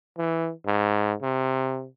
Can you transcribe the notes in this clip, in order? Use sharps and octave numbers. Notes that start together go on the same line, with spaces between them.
E3
G#2
C3